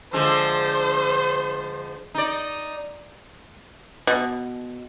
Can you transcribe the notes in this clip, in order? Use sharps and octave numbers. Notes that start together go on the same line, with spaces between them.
D3 F3 G#3 C5
D#4 D5
B2